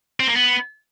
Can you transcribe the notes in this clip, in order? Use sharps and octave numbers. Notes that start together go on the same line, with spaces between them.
C4
A#3
B3